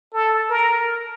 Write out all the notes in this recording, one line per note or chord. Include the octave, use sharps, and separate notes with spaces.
A4
A#4